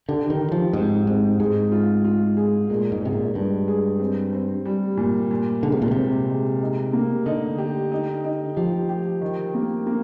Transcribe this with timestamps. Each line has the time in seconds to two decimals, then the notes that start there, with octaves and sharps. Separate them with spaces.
0.09 D3 G4
0.30 D#3
0.41 G4
0.52 F3
0.73 G#2 C4
1.07 G#2 C4
1.40 G#2 G#4
1.72 F4
2.04 F4
2.37 G#4
2.70 A#2 G#3
2.92 G#2
3.02 C3 G#3
3.13 A#2
3.34 G2 G#3
3.68 G#4
4.00 C4
4.33 C4
4.66 G3
4.97 A#2
5.31 A#2
5.63 D3 G#3
5.72 C3
5.82 A#2
5.91 C3 C4
6.28 G#3
6.61 D#4
6.93 A#3
7.26 D3 D#4
7.58 G4
7.92 D#4
8.24 D#4
8.57 F3 G4
8.89 G4
9.21 D#3
9.54 A#3
9.87 A#3